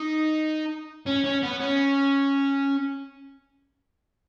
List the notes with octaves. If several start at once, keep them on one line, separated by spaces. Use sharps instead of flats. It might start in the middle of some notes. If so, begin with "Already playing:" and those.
Already playing: D#4
C#4
C#4
B3
C#4